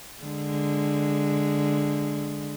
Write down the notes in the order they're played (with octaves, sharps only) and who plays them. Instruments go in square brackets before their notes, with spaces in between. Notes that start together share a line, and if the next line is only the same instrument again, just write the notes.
[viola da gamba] D3 G#3